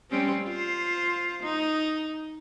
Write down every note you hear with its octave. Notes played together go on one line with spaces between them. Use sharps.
G3 C4 C#4
F4 C5
D#4